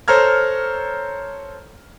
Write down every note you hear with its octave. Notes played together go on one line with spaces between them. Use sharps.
A4 C5 C#5 A#5 F6 G#6